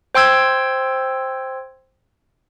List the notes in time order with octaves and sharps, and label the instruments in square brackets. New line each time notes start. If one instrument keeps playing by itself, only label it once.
[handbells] C5 G5 C6 E6 G#6